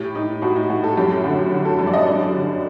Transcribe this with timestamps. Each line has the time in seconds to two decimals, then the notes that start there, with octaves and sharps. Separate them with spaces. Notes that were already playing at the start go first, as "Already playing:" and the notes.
Already playing: A2 G4
0.15 A2 D#4
0.42 A2 F#4
0.56 D#4
0.69 A2 F#4
0.84 A4
0.97 F#2 G4
1.24 D3 F#4
1.52 D3
1.65 A4
1.79 F#2 A4
1.87 D5
1.94 D#5
2.07 G2 D5
2.34 D3